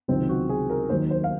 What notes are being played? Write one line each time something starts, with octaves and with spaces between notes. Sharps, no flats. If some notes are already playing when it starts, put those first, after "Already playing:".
C#2 C3 D#3 F#3 C4
F#4
G#4
A#4
D#2 D#3 F#3 C5
C5
F5